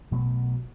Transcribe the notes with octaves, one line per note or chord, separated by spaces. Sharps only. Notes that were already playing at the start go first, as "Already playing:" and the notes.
B1 B2 F#3 A3